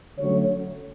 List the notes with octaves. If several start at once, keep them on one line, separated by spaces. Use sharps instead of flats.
D3 F#3 A3 C#4 C#5